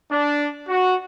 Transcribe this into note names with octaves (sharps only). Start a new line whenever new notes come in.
D4
F#4